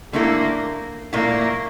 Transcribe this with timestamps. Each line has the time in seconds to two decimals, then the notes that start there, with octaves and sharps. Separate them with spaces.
0.13 D3 A3 A#3 E4 A4
1.13 A#2 A3 A#3 E4